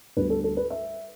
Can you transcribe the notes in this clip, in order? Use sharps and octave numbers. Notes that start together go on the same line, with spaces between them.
D2 D3 G3 B3 B4
A4
A4
B4
E5